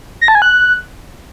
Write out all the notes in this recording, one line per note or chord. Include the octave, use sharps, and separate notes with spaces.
A#6
A5
G#5
F#6